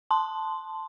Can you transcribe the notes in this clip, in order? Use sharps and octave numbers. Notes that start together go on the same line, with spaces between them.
A5 C6